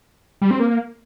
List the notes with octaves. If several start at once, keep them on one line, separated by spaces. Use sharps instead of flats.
G3
C4
A#3